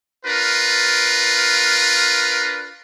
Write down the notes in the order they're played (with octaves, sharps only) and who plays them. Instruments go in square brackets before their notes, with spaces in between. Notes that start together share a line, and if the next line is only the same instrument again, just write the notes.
[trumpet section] D4 F4 A#4 B4